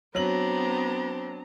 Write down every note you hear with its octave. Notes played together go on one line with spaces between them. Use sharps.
F#3 B3 C4 D4 A#5 F#7